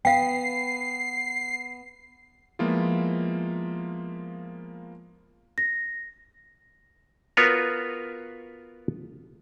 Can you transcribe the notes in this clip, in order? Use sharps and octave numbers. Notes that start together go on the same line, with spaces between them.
B3 F5 G5 C7
F3 G#3 A#3 B3 E4 F4
A#6
B3 F4 F#4 A#4 B4 C#5